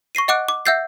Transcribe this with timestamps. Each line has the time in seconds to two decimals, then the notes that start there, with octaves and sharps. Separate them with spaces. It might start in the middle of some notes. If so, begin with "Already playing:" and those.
0.15 C#6 A#6 C7 D#7
0.28 D#5 F#5 D6 F#6 D7
0.49 D6
0.66 E5 F#5 E6 G6 A6 C7